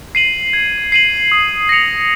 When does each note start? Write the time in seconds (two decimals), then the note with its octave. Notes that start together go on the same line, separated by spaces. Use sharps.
0.15 C7 D#7 F#7
0.53 G#6
0.92 C7 D#7 F#7
1.32 D#6
1.69 A#6 C#7 F7